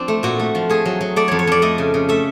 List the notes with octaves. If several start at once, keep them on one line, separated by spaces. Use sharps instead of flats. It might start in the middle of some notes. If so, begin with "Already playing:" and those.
Already playing: F3 C4 D4
A3
A#2 F#4
A3
F3
A3 G#4
F#3
F#3
A3 D5
F2 C#5
C#5
F2 D5
A3 D#5
C#3
C#3
A3 E5